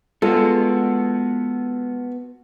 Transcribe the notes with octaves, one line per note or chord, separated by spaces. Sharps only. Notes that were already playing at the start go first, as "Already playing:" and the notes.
G#3 B3 F4 F#4 A4